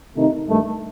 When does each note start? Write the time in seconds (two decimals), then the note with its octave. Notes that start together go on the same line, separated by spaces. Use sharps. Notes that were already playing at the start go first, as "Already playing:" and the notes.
0.15 C3 D#3 A3 D#4
0.47 G2 D#3 A3